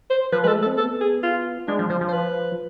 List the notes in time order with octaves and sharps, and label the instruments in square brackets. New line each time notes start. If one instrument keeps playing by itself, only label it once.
[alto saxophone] C5
[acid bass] F3 [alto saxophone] B4
[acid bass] G#3 [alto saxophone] A4 B4
[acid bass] A3
[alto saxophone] A4
[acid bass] C4
[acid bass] B3 [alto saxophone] A4
[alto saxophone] G#4
F4
[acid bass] G#3 [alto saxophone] D4
[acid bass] F3
[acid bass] F3 [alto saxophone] C5
[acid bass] F3
[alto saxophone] C5
B4